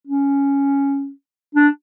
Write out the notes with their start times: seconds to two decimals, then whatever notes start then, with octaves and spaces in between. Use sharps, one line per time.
0.07 C#4
1.55 D4